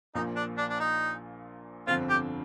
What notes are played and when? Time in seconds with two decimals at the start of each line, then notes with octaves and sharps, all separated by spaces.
0.15 A#1 A#2 F3 A#3 D#4
0.36 D4
0.58 D4
0.70 D4
0.80 D#4
1.87 G1 F2 D3 F3 C4 F4
2.10 G4